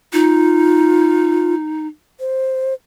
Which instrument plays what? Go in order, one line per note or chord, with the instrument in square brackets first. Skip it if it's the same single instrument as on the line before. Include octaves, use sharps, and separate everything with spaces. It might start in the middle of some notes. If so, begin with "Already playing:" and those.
[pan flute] D#4 [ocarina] F4
[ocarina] C5